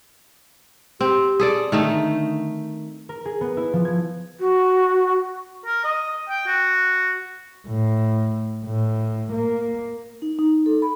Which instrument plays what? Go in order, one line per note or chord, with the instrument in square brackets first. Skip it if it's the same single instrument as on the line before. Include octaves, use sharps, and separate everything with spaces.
[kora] C4 [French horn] G4
[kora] G#4 A4 D5
[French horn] D3 [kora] D#3 A3 D#4
[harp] A#4
G#4
B3
E4
F3
G#6
[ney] F#4
[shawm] A#4
D#5
G5
F#4
[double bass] A2
A2
A#3
[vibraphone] D#4
D#4
A4
B5